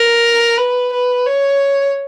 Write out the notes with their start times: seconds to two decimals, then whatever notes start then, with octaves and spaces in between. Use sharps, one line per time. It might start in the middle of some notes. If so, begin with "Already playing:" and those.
Already playing: A#4
0.58 B4
0.93 B4
1.26 C#5